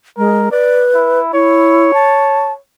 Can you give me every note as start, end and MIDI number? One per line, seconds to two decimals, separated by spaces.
0.18 0.48 56
0.18 0.48 70
0.51 1.20 71
0.51 0.84 74
0.94 1.29 64
1.33 1.92 64
1.33 2.59 73
1.94 2.52 81